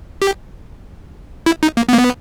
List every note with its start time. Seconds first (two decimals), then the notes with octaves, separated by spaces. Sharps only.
0.22 G4
1.46 E4
1.63 D#4
1.77 A#3
1.89 B3
1.93 A#3
1.99 B3